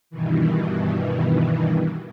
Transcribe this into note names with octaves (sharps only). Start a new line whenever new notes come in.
G2 B2 D#3 E3